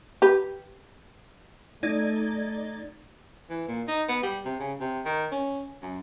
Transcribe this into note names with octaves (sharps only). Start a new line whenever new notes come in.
G4 B4
A3 D#4 D5 G#6
E3
A#2
D#4
B3
G3
C3
C#3
C3
D#3
C#4
F#2